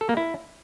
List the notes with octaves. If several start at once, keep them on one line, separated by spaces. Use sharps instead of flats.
A4
A#3
E4